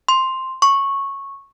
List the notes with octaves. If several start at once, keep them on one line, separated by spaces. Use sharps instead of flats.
C6
C#6